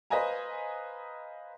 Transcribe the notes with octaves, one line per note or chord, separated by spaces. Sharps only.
B4 C5 D#5 F5 G#5 A#5